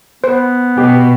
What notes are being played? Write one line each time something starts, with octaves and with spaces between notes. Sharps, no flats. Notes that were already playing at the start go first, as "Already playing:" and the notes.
B3 C5
B2 G4